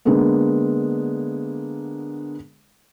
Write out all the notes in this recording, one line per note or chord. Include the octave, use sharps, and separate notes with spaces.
D3 G#3 A#3 B3 D4